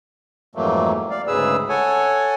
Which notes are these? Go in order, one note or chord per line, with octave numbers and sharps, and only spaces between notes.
F2 G#2 E3 F#3 A3 A#3
D5 F5
D2 G#2 C#3 G#4 B4 E6
A4 C#5 F#5 G#5